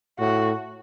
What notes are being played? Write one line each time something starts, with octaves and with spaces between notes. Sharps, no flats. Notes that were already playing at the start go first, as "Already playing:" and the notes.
A2 F#4